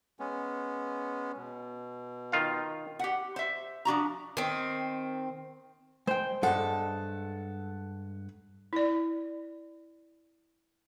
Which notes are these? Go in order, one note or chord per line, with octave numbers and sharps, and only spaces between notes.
G#3 B3 C#4
B2
D#3 F4 F5
G4 F#5
C5 E5
F3 D4 F#4 A#5
D#3 C4
G#3 C5 G5
G2 G#3 A4 F#5
E4 D5